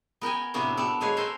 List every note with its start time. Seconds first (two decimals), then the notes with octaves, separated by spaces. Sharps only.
0.21 B3 A#4 G5 G#5
0.54 A2 C3 A#3 B3 D4 F#4
0.77 B3 A4 D5 A5
1.01 A#2 G#3 B4 C#5 F5
1.17 A4 A#4 C5 F5 G#5